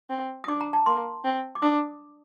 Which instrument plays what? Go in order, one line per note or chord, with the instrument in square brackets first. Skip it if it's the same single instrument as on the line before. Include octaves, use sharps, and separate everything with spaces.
[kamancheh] C4
[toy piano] D#6
[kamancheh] D4 [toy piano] D6
[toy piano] A#5
A5
[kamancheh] A#3 [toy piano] C6
[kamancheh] C4
[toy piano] D6
[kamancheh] D4 [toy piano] D#6